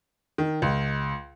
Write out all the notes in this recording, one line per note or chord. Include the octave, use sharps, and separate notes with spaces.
D#3
C#2